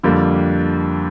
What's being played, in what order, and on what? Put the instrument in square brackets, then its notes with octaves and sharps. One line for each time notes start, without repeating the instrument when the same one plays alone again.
[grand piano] F2 D3 G3 A#3